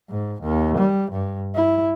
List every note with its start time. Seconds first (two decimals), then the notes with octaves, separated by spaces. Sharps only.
0.10 G#2
0.42 D#2
0.78 G3
1.12 G2
1.55 E4